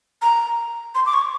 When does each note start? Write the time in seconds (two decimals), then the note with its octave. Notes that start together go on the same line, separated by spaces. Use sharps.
0.22 A#5
0.95 C6
1.06 D6
1.14 C#6